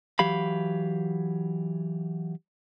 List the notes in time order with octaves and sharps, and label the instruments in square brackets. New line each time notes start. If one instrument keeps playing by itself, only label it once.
[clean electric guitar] E3 F#3 G4 F5 B5